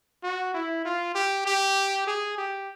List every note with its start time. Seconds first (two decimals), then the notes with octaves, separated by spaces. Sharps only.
0.23 F#4
0.54 E4
0.85 F4
1.15 G4
1.46 G4
2.07 G#4
2.38 G4